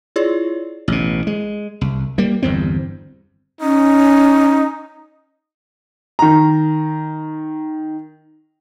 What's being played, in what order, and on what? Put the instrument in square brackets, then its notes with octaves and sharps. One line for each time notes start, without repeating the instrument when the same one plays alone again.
[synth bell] E4 F4 G#4 C#5 D5
[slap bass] A1 B2
G#3
C2
G3 A#3
G1 E2 G2 C4
[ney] C#4 [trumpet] D#4
[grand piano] D#3 A#5